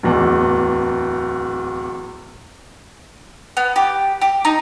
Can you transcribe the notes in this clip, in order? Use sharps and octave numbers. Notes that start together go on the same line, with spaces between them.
D1 E2
B3
G4
G4
D#4